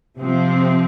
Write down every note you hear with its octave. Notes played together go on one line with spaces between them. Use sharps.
C3 F3 C4